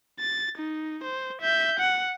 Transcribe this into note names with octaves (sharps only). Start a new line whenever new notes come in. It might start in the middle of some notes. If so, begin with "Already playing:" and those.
A6
D#4
C5
E5 G6
F#5